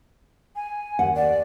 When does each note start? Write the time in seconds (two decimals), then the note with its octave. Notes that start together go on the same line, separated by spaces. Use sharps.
0.56 G#5
0.99 D#2 F#5
1.16 D5